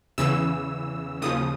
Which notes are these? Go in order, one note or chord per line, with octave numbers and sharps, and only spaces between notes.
E2 C#3 E3 E6
D#2 C#3 F3 D#6